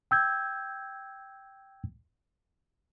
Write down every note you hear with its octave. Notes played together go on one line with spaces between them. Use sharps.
G5 E6 G6 G#6